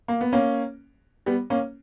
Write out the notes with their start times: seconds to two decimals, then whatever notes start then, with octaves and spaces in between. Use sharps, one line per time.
0.08 A#3
0.21 B3
0.33 A#3 C#4
1.26 G3 B3
1.50 A#3 C#4